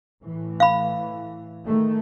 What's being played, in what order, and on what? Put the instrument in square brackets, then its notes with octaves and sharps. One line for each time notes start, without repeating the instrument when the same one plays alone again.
[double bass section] A2 E3
[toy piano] F5 B5
[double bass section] D#3 G#3 A3